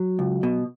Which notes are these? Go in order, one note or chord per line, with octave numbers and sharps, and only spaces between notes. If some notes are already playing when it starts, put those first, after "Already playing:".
Already playing: F#3
C#2
B2